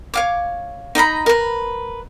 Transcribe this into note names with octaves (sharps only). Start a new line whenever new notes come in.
C#5 F5 D6
D#4 D#5 A#5 B5
A#4 B4